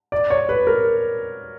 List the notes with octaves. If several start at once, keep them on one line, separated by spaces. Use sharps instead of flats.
D5
C#5
B4
A#4